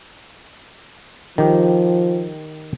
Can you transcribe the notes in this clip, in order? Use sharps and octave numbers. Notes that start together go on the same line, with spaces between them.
D#3 F3 G4